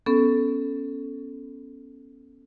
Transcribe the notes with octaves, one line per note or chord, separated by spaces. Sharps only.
B3 C#4 A4